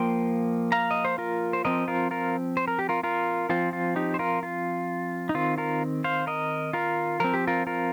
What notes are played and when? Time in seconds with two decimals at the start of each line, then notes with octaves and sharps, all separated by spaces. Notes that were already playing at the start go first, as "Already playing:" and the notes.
Already playing: F3 A#3 G5 C6
0.72 F5 A#5
0.91 D#5
1.05 C5
1.18 F4 A#4
1.53 C5
1.65 F3 C4 A#4 D#5
1.88 F4 A#4
2.11 F4 A#4
2.57 C5
2.68 A#4
2.79 G4
2.89 F4 A#4
3.03 F4 A#4
3.49 F3 C4 F4
3.73 F4
3.96 D#4 G4
4.14 C5
4.19 F4 A#4
4.43 F4
5.29 D#4
5.35 D#3 C4 F4
5.58 F4 A#4
6.04 C5 F5
6.27 A#4 D#5
6.73 F4 A#4
7.20 F3 C4 A#4
7.34 G4
7.47 F4 A#4
7.67 F4 A#4